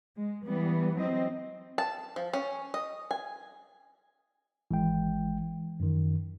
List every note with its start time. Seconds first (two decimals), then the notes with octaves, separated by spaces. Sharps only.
0.16 G#3
0.45 E3 G3 B3
0.96 F#3 C4 D#5
1.78 A5
2.16 F3
2.34 C#4
2.74 D#5
3.11 G#5
4.71 G#1 E3 G#3 G5
5.80 F#2 D#3